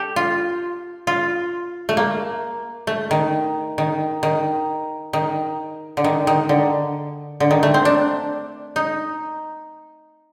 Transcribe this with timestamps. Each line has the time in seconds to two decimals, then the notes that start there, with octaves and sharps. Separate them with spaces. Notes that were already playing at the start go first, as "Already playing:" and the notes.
Already playing: G4 A4
0.16 F4
1.07 F4
1.89 A3
1.97 A#3
2.87 A3
3.11 D#3
3.78 D#3
4.23 D#3
5.13 D#3
5.97 D3
6.04 D#3
6.27 D#3
6.49 D3
7.40 D3
7.51 D#3
7.63 A3
7.74 C4
7.85 D4
8.76 D#4